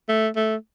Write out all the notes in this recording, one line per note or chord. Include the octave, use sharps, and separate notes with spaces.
A3
A3